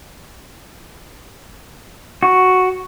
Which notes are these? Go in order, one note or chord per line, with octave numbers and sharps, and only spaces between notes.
F#4